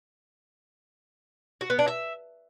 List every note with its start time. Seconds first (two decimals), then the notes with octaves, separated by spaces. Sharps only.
1.61 F#4
1.70 B3
1.79 D4
1.88 E5